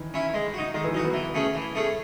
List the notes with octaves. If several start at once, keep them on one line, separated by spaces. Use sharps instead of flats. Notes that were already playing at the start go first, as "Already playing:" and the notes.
Already playing: D#3 E3
C#4 E4
G#3
D#4 F#4
D#3 G#3
E3
F#3 D#4 F#4
B3
E3
A3 C#4 G#4
E3
A3 C#4 G#4